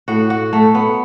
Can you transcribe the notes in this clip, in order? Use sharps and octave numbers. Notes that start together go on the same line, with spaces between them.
A2 F#4
F#4
F#3 A3
B3